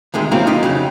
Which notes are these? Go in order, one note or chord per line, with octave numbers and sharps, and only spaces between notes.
D2 C3 D#3 G#3
F#3 A#3 C4 C#4 E4 F4
D#4 F4 G4
F2 C#3 F#3